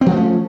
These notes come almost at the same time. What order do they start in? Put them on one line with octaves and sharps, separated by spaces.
C4 F3 A3 C#4